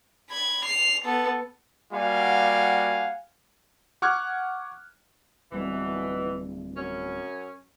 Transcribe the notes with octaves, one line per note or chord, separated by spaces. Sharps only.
B5 G#6
C7 F7
B3 A4
G3 A#3 F#4 F5 F#5 G#5
F#5 C#6 D6 F6 F#6 G#6
D1 B2 E3 G3 C4
F#2 C#4